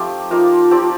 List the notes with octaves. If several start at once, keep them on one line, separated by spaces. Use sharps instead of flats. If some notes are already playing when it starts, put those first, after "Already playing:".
Already playing: F3 A3 C4 D#4 G4
F3 A#3 D#4 F4
F3 C4 G4 D5